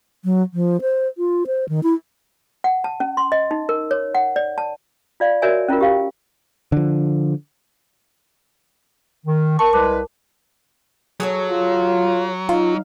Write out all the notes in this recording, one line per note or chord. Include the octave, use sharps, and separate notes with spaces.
F#3
F3
C5
F4
C5
D#3
E4
F#5
A5
C#4
C6
D#5
D#4
A#4
C#5
F#5
D5
A5
F4 D5 F5
F#4 A#4 C#5 D5 E5 G#5
C#4 E4 F4 A#4
G4 F5 G5
D3 F3
D#3
A#4 A5 C#6
C2 G#3 B4 A5 D6
F#3 G#4 A4 C#5
F4
D#4 F4 F5